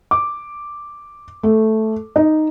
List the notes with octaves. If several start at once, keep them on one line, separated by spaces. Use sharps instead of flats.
D6
A3
D#4